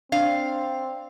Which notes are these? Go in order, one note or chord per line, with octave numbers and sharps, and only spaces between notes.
C4 D4 F5